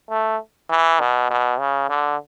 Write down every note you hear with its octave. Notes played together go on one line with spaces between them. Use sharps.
A3
E3
B2
B2
C#3
D3